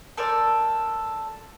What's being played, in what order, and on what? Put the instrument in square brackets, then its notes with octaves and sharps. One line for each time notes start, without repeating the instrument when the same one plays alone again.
[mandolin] A4 A#4 C5 D5